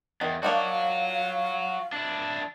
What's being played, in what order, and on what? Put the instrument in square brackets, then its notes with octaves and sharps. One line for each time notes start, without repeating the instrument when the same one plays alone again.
[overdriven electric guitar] E2 [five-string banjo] D#3
[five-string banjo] A#3 D4 D#4 [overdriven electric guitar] F#4 C#5 [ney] F5
[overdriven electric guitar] D4 E4